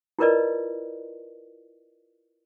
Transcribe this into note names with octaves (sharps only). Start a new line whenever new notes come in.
E4 F4 A#4 B4 D5 D#5